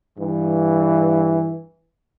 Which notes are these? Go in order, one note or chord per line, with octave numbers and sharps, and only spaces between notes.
G2 E3